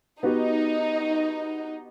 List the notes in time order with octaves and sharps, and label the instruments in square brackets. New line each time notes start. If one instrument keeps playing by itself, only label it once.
[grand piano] B3 F#4 G4 [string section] D#4